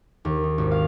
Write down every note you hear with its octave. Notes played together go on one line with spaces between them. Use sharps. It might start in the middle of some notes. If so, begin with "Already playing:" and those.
D#2
D#4
G#1
F5